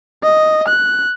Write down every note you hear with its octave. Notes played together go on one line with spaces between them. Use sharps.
D#5
F#6